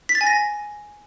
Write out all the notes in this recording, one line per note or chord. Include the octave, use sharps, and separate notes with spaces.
B6
A6
G#5
A#6